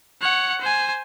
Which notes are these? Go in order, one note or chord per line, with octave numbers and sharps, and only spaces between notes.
C#5 F#5
C5 G#5